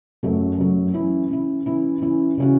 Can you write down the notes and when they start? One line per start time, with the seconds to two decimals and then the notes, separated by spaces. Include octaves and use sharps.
0.23 F#2 F#3 A3
0.58 F#2 F#3 A3
0.94 E3 C#4 E4
1.30 E3 C#4 E4
1.66 E3 C#4 E4
2.02 E3 C#4 E4
2.38 C#3 E3 C#4 F#4